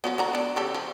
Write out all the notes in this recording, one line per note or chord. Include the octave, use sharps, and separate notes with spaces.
F3 F#3 B3
D3 F#4 A#5
B3 D4
C#3 G4 A4
F3